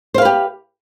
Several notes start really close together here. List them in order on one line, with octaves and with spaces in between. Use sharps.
C5 F5 B4 G4